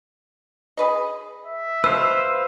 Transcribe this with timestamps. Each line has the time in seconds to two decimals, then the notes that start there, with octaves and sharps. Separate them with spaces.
0.77 G#4 B4 D#5
1.46 E5
1.84 B2 B4 C5 F5 E6